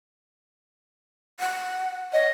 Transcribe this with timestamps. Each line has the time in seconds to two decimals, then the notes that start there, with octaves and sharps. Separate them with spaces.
1.40 F#5
2.13 C#5 D#5